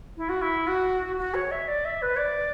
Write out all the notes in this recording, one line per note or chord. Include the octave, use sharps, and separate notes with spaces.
E4
F#4
E4
F#4
F#4
C#5
E5
D5
E5
B4
D5